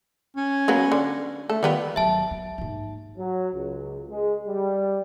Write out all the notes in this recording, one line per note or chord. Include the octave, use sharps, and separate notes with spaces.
C#4
F#3 A#3 B3
D3
A3 A4
D#3 G3 B3 F4
G#1 F#3 E5 A5
A3
G#2 A#3
F#3
C#2
G#3
G3